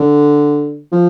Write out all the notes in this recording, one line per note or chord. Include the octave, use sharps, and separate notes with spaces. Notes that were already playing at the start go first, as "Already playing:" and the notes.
Already playing: D3
F3